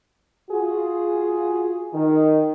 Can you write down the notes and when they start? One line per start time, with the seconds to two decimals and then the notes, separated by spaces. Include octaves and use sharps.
0.50 F4 F#4 G#4
1.93 D#3